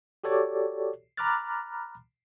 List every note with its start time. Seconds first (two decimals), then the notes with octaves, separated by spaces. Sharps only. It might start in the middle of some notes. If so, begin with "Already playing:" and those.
0.24 F#4 G4 A4 C#5 D5
1.17 A#5 B5 D6 F6 F#6 A6